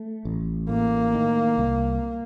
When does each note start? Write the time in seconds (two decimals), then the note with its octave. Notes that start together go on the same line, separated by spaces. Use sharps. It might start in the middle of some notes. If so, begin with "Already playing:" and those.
Already playing: A3
0.25 A1
0.69 A2 A#3
1.14 D#3
1.58 C2